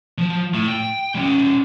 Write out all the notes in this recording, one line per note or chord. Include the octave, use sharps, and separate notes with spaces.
F3
A2
G5
G3 C#4